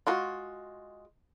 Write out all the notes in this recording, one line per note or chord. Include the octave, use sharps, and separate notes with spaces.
G#3 F4 F#4